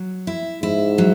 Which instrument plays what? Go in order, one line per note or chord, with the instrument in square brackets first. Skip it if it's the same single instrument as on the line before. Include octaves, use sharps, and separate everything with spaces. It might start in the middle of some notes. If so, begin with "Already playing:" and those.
Already playing: [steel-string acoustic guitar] F#3
E4
[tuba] G#2 [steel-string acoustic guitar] E4
[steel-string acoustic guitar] F#3